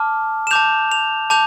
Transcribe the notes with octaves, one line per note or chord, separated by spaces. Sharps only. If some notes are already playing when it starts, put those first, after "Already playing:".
Already playing: A5 D6 F6
E7
A5 D6 G6 F7
F7
A5 D6 G6 F7